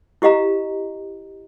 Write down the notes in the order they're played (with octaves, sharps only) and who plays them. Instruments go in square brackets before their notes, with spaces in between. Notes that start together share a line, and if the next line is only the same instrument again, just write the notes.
[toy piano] E4 G4 D#5 F5 A#5